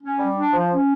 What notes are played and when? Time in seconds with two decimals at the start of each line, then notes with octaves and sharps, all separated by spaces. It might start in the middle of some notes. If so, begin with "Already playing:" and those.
0.01 C#4
0.18 G3
0.36 D4
0.53 F3
0.72 C#4